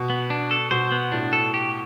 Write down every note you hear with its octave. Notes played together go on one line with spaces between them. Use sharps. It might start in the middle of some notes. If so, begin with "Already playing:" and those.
Already playing: B2
B3
D4
A4
B2 C5
B3
A2 D4
A4
G4